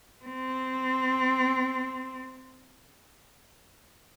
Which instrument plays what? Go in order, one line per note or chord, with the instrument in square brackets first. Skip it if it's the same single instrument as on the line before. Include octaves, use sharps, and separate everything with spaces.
[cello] C4